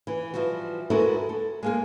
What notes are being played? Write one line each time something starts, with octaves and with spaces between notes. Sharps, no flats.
E3
E3 F3 G3 F#4
G#3 B3 E4 F#4 A4 A#4
A4
G#3 A#3 G#4